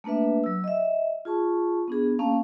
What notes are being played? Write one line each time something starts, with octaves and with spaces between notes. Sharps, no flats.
A3 A#3 D4 B4 E5
F#3 E6
D#5 E5
F4 G#4 A5 C#6
B3 D4 G#4
A#3 C#4 F5 A5